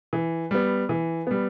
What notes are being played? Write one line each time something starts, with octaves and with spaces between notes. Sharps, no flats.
E3
G3 B3
E3
G3 B3